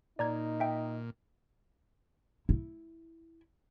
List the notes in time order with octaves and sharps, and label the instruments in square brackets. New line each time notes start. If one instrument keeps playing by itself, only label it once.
[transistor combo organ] A#2 [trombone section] D#4 [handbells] D5 A#5 G#6
[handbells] E5 G5
[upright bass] E4